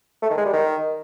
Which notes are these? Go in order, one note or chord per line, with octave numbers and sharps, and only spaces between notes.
A3
D#3
G#3
G3
D#3